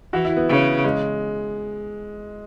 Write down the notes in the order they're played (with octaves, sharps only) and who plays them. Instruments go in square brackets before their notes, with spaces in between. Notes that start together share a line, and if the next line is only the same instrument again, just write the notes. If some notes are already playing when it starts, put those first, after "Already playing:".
[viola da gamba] E3 [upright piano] F#4
[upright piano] E4
B3
[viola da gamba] C#3
[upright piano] G#3